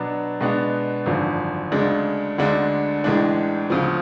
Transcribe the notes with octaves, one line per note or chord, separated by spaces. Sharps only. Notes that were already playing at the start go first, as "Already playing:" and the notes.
Already playing: B2 F#3 B3 D4
B2 G#3 B3 D4
G#1 F#2 D3 F3
D2 C#3 G#3 D4
D2 D3 G#3 D4
A1 A2 G#3 D4
D2 C#3 F3